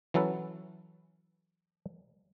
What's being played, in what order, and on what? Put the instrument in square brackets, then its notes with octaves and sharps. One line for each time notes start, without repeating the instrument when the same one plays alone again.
[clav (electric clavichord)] E3 F#3 C#4 A4 B4